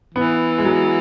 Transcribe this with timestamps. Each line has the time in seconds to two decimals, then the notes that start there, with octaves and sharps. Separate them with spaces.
0.15 E3 B3
0.58 G#3
0.65 F#3